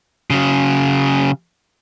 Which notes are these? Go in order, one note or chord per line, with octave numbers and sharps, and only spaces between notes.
C#3 F#3